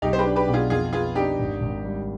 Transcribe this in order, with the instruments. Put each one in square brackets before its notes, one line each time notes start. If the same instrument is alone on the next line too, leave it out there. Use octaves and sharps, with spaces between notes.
[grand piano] B1 [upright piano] D#4 G4
[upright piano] C5
G4 B4
[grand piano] D4
[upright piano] G4 B4
[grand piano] B2 [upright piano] G4
[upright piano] F4 G#4
[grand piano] F2 [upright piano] F4 G#4
[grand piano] B3 [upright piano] F4 G#4
[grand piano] D4 [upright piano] D#4 G4
[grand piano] G#1
G#1
G3